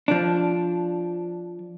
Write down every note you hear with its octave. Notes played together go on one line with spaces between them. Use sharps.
F3 D4